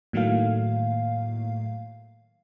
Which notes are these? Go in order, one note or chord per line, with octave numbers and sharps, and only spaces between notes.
A2 D#3 F#3 A3 A#3 F5